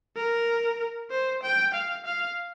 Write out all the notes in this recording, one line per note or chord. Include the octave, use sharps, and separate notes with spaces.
A#4
C5
G5
F5
F5